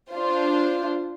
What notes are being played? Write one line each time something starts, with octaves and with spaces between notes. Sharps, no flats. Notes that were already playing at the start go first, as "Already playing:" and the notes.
D4 F4 C5